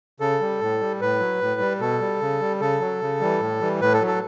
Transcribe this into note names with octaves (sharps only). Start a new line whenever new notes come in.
C#3 A4
G3
A2
G3
A2 B4
F#3
A2
G3
B2 A4
G3
C#3
G3
C#3 A4
F#3
C#3
E3 G3
A2
E3 G3
A2 B4
A4
F#3
A4